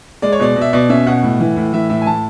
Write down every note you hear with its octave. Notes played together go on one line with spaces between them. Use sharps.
G#3 D5
C#5
B2 D5
B2
E5
B2 D5
C#4 E5
B2 F#5
A2
E3
A2
E3 E5
A2 E5
G#5
A2 A5